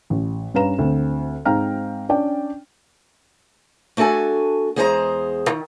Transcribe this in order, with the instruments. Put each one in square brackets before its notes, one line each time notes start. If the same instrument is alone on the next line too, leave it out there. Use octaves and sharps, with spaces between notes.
[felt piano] A1
G2 C#4 B4 F5 A#5 E7
D2 C4
G#2 C4 F5 G5 A#5 F6
C#4 D4 D5 G5
[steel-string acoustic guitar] A3 D4 F#4 A4 G#5
E2 G#3 G#4 C5 F#5 A#5
D#3